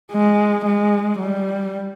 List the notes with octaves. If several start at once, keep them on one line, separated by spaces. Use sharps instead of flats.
G#3
G#3
G3